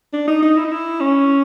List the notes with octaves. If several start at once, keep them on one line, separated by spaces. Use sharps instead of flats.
D4
D#4
D#4
E4
D#4
E4
C#4